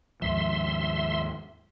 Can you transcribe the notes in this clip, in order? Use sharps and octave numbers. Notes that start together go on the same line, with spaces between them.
D#2 G#2 F3 E5 C6